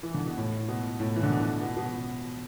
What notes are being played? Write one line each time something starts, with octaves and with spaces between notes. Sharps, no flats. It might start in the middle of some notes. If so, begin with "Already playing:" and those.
E3
D3
B2
A2
B2
A2
E3
D3
B2
B2
B2